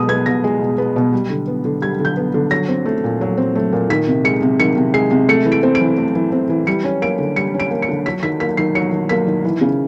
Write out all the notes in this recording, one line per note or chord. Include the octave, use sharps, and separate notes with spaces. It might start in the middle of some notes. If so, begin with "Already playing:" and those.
Already playing: B2 G#3 D#6
B3 G#6
B2 A#6
G#3
B2
B3
B2
G3
D3
B3
D3
G3 G#6
D3
G6
B3
D3
F#3 A#6
C4
A3
A#2
F#3
C4
A3
A#2
D#3 B6
C3
G#3 C#7
C3
D#3 C#7
C3
G#3 C7
C3
A3 C#7
E3
D7
C4
D7
E3
A3
E3
C4
E3
G3 C#7
C#4
A#3 D7
D3
G3 C#7
C#4
D7
A#3
C#7
D3
F#3 B6
D#3 B6
A#3 B6
D#3 C7
F#3 C#7
D#3
A#3 B6
D#3
E3
C#3